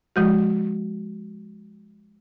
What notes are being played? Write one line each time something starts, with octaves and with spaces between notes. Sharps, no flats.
F3 G#3 F#4